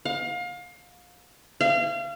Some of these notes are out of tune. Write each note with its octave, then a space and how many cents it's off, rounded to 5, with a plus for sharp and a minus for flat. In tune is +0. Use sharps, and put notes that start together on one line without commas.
F5 +30
F5 -35